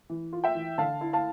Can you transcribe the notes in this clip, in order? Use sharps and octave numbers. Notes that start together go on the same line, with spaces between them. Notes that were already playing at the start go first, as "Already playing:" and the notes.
E3
F4
E5 G5
E3
D3 F5 A5
E4
F5 A5